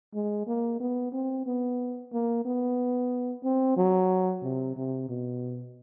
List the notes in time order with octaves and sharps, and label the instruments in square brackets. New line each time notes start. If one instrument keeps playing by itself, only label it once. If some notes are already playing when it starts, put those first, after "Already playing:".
[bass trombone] G#3
A#3
B3
C4
B3
A#3
B3
C4
F#3
C3
C3
B2